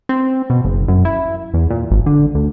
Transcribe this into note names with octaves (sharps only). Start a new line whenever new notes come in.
C4
B2
F#1
F#2
E4
E2
A#2
G#1
D3
D2